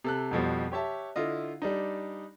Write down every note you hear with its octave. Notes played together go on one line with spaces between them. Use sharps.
C3 A4 F#6
F2 B2 F3 G3
G4 C#5 E5 A5
D3 E4 F4 D#5
G3 D4 D#4